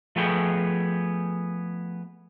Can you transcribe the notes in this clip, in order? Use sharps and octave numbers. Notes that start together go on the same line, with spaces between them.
F3 A3 B3 G#4 G5